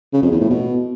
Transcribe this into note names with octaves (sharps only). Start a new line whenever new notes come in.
C#3
F2
E2
A2
B2